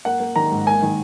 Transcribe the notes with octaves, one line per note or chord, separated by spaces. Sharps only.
A#3 F#5
A#3
D#3 A#5
G#2
A#3 G#5
D#3